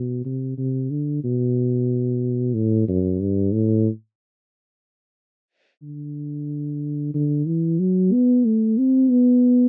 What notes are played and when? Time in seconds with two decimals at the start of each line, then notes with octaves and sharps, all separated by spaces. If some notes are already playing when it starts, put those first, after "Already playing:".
Already playing: B2
0.25 C3
0.57 C3
0.90 D3
1.24 B2
2.54 A2
2.88 F#2
3.20 G2
3.53 A2
5.82 D3
7.14 D3
7.47 E3
7.79 F#3
8.13 B3
8.45 A3
8.78 C4
9.10 B3